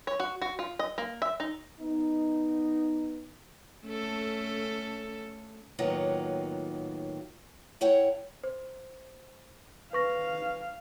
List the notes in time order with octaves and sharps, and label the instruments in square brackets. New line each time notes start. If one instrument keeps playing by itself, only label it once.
[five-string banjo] C#5
F#4
F#4
F4
D#5
A#3
E5
D#4
[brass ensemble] B3 D#4
[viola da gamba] A3 C#4 A4
[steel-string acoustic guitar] A2 D#3 F#3 A#3 B3 F4
A3 E4 C#5 F#5 G5
[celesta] C5
[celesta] B4 C#6 A#6 [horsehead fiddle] F5